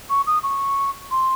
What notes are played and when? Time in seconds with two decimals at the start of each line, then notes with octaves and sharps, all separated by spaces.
0.10 C#6
0.27 D#6
0.43 C#6
1.11 C6